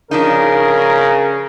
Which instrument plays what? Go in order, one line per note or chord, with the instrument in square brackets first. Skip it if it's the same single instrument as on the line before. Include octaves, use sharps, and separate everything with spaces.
[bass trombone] C#3 [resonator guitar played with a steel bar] F3 D4 D#4 [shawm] A#4